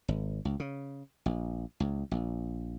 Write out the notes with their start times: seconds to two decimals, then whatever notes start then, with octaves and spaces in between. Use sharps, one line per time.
0.08 G#1
0.45 C#2
0.60 C#3
1.26 A#1
1.80 C#2
2.11 A#1